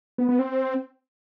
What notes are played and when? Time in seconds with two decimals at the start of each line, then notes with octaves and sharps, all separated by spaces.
0.18 B3
0.29 B3
0.39 C4